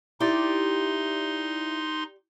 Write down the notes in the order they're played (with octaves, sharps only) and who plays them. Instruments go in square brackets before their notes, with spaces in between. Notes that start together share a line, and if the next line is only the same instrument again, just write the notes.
[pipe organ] D#4 C6 [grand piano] E4 [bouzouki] G4 D5